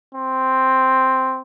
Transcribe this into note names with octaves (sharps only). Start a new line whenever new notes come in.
C4